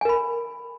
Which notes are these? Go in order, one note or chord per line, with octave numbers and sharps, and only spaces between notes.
A#4 G#5 B5